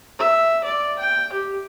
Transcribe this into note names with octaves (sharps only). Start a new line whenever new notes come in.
E5
D5
G5
G4